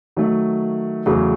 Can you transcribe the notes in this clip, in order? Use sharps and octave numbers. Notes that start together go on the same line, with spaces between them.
D#3 F#3 A3
E2 C#3 F#3 A3